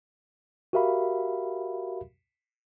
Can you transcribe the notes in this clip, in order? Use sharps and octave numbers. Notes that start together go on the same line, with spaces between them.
F#4 G4 A#4 E5 F5 B5